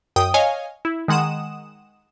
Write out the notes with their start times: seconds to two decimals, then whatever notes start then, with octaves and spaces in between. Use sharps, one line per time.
0.16 F#2 G5 D#6
0.34 C#5 D#5 F5 G#5
0.85 E4
1.08 D#3 G#3 F#5 D#6 E7